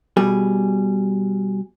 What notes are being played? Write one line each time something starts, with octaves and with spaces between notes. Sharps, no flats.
B2 G3 G#4